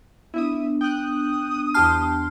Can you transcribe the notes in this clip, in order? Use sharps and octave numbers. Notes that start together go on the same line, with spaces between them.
B3 D4 E4 E5 D#6
G5 D#6 F#6
E2 G4 A5 C6 F6